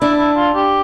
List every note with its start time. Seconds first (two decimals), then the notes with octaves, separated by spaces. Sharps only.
0.01 D4 E4
0.19 E4
0.37 F4
0.55 G4